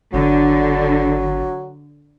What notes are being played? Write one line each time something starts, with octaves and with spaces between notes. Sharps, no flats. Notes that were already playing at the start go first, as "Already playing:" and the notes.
G1 D3 F#3